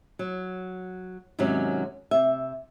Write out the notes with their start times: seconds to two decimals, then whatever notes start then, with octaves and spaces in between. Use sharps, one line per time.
0.19 F#3
1.39 G#2 C3 D#3 F#3 C#4
2.11 C3 E5